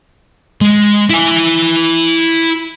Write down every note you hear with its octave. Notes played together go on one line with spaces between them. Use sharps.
G#3
E4 G#5